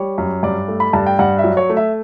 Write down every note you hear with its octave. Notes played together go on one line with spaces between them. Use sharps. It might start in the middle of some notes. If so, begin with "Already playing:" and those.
Already playing: G3 C#5
F#2
G2 D5
A3
B5
G2 A5
G5
G2 F#5
E5
F#3
C#5
A3
E5